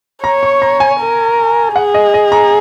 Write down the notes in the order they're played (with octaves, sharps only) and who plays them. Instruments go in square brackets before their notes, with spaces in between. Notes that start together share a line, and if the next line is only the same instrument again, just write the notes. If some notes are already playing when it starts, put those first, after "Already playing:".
[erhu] C#5 [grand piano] A#5
[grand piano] C#6
A#5
G#5
[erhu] A#4
[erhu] G#4 [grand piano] F#5
[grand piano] D#5
D#5
A#5